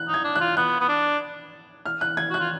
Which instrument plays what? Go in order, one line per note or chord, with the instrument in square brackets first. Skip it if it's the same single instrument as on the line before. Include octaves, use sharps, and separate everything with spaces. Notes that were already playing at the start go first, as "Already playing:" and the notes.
Already playing: [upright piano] F#6
[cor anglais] D#4
[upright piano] G#6
[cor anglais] D4
[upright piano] F#6
[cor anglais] F4
[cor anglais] B3 [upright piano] F#6
[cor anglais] B3
D4
[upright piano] F6
F#6
G#6
[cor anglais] F#4 [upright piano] F#6
[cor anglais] F4